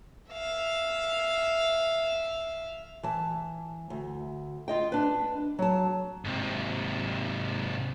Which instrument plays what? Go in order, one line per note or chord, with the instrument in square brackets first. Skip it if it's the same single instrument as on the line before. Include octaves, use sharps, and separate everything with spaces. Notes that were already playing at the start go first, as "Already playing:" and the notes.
[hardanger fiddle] E5 F5
[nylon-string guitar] E3 A5
D2
F4 D#5 G5
D4 B4
F#3 A5
[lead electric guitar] G#2 C3